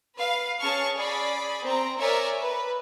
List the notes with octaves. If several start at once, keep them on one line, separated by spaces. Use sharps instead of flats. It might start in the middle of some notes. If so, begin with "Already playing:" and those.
B4 F5
C#4 G#4 A5 C#6 F6
G#4 D5 B5
C4 A#5
A#4 C#5 D5 E5 G#5 A#5
B4